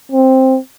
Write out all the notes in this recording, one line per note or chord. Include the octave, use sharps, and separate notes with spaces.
C4